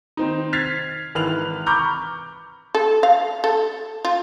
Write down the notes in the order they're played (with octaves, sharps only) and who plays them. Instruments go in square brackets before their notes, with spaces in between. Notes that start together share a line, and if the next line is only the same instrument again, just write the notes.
[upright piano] D#3 C4 D#4
F6 G#6 A6 B6 C7 F7
G#1 E3 B4 F6 F#6 F7
A#5 B5 C#6 D6 F6 G6
[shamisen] A4
F5
A4
F4